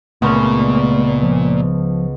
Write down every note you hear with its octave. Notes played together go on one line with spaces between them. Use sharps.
C#2 A#2 A3 B3 C#4 A5 C#6
F3